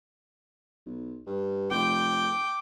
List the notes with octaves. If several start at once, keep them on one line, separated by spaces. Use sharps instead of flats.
B1
G2
F1 G5 D6